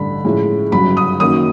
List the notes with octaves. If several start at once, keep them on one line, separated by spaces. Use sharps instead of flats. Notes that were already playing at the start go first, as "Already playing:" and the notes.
Already playing: A1 G2 D3 B5
A2 F3 G#3 C#4
G1 F#2 C#3 F#3 B5
D#6
F#2 D#3 F#3 A#3 C#4 D#6